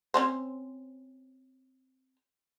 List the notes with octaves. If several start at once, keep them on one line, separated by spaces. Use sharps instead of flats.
C4 C#4 C5